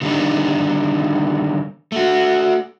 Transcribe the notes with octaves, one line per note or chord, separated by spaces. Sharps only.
D3 D#3 G3 B3 D4 D#4
A3 F#4